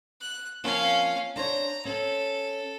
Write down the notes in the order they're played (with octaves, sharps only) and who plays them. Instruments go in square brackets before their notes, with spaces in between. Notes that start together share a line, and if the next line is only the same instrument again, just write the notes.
[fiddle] F#6
[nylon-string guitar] F3 A#3 C4 [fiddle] C#4 F5
[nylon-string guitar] D4 C5 C#5 [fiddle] A#5
[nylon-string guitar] C#4 C5 [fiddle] A4